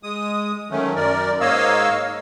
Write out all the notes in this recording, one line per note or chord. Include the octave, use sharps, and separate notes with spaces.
G#3 D#6
D#3 F#3 A3 C#4
F#2 A#4 D5
G#2 A#3 C#5 D#5 F5 E6